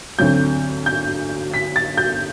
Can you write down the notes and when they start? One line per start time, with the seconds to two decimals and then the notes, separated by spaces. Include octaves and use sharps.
0.19 D2 D3 F#3 C4 G6
0.86 G6
1.54 B6
1.76 A6
1.97 G6